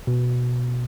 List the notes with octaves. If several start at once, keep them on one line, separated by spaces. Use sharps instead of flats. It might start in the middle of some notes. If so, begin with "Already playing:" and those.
B2